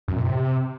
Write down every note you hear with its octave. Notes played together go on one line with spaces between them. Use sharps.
F#2
A#2
C3